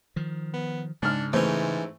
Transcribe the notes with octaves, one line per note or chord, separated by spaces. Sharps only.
D#3 F3
B3
G#2 C#3 D4 F6
G#2 E3 A3 C4 C#4